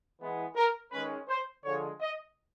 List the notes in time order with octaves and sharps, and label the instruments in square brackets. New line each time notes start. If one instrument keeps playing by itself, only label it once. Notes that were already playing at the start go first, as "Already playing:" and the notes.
[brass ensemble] E3 G#3 B3
A#4
D#3 G#3 C#4 B4
C5
D3 F3 G#3 C#5
D#5